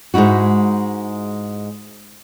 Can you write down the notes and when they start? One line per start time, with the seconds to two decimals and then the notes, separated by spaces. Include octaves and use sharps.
0.14 G#2 G#3 D#4 E4 F#4